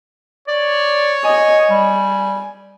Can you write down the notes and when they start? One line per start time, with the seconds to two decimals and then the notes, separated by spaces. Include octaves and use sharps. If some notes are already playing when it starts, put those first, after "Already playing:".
0.48 C#5 D5
1.24 D#5 G#5
1.70 G3 G#5